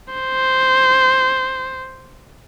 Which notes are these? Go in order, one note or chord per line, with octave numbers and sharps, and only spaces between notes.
C5